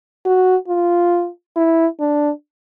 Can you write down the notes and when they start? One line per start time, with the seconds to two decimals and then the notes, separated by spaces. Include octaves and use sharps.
0.25 F#4
0.68 F4
1.56 E4
2.00 D4